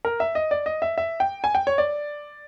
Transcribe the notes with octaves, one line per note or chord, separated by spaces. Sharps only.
A#4
E5
D#5
D5
D#5
E5
E5
G5
G#5
G5
C#5
D5